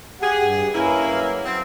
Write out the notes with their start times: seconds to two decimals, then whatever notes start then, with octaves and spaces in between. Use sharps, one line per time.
0.21 G4 G#4 F#5
0.38 G2
0.74 A#3 C#4 E4 B4
1.11 F#3
1.44 C4